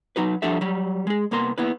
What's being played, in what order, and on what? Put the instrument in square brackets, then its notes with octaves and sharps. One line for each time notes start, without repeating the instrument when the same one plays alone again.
[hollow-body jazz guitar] F#3 D#4 F#4 B4
F3 G3 D4 F#4 A4 E5
F#3 G3
G#3 G#4
C2 A#3 B3 A#4 C6
A#3 B3 E4 B4